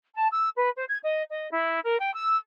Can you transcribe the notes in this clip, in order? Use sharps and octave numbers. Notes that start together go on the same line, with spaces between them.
A5
E6
B4
C5
G#6
D#5
D#5
E4
A#4
G5
E6